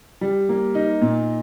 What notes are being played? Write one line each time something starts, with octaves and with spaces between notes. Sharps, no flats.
G3
A#3
D#4
A#2